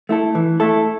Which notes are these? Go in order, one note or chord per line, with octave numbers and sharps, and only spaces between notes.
A3 E4 A4
E3
A3 E4 A4